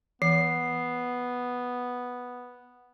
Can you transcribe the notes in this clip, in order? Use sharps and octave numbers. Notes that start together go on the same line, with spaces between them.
E3 B3 C7